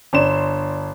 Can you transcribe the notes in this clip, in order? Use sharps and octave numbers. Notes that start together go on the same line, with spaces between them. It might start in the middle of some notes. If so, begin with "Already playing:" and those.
G1 D4 C6 E7